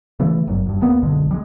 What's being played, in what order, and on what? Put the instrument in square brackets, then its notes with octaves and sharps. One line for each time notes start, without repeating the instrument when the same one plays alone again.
[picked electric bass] C#3 E3 A3
G1 F#2
F#1 G2
D#1 A#3 B3
F#1 B1 D3 G#3
G3 G#3